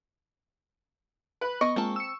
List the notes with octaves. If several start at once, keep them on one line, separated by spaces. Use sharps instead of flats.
B4
B3 D#5 C#6
G#3 A#3 C4 F4 A5
E6 C#7